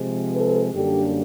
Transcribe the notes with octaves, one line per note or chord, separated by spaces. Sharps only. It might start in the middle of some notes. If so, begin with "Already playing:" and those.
Already playing: C3 F3 G#3
A4 B4
F#2 D3 G3 A#3 D4 G4 A4